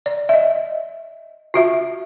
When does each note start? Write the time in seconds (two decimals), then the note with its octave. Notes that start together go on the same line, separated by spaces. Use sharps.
0.06 D5
0.29 D#5 E5
1.54 F4 F#4 E5